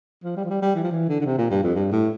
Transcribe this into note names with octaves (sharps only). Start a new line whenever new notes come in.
F3
G3
F3
G3
G3
E3
F3
E3
D3
D3
C3
A#2
G2
F2
G2
A2